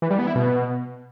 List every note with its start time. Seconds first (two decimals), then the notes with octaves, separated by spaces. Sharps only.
0.02 E3
0.10 G3
0.19 B3
0.27 E4
0.35 B2